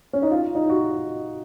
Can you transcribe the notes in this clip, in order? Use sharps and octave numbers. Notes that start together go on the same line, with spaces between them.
C#4
D#4
F4
D#4
F#4